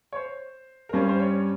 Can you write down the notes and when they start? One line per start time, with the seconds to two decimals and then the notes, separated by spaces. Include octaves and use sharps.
0.13 C#5
0.16 C5
0.89 A#4
0.93 G2 G3 C#4 C5
1.09 C5
1.20 C#5